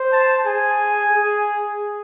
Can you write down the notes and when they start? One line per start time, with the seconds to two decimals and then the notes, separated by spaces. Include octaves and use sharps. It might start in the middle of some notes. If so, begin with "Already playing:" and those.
Already playing: C5
0.12 A5
0.46 G#4 G#5
1.13 G#4